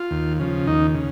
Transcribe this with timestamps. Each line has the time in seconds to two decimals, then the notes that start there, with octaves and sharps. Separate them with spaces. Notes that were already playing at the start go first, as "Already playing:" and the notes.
Already playing: F4
0.11 D#2
0.40 C#3 F3
0.67 D#2 D#4
0.95 C#3